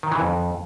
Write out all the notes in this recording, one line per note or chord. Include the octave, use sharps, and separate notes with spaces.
D#3
E3
F2